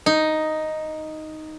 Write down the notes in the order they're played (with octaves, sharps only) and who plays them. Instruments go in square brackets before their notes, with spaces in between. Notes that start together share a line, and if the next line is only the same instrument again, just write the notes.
[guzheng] D#4